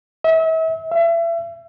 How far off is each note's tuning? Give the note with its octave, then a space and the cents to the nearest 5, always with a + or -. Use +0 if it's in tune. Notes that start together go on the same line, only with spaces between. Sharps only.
E5 -35
E5 +35